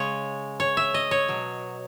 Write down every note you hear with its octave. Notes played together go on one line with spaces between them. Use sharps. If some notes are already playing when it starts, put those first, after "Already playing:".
Already playing: C#3 G#3 C#5
C#5
E5
D#5
C#5
B2 F#3